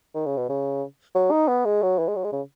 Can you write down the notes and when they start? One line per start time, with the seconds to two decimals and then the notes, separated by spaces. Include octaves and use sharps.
0.14 D#3
0.26 C#3
0.37 B2
0.49 C#3
1.15 F#3
1.31 D#4
1.48 B3
1.65 G#3
1.83 F#3
1.99 E3
2.08 G#3
2.16 F#3
2.24 G#3
2.32 C#3